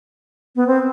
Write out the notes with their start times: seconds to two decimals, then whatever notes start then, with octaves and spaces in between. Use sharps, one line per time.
0.56 B3
0.67 C4